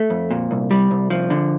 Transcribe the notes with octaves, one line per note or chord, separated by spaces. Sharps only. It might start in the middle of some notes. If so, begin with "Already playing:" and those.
Already playing: A3
F2
A#2
C2
G3
C2
F3
D3